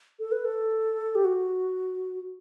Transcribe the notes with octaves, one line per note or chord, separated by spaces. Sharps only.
A4
B4
A4
G4
F#4